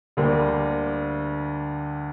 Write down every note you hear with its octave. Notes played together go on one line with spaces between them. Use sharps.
D2 D3 G3 A#3